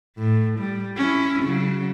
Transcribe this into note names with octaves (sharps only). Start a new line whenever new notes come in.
A2
G3
C#4 E4
C#3 F#3